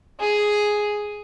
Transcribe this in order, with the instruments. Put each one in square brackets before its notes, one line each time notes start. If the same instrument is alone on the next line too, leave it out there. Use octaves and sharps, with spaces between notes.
[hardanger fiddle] G#4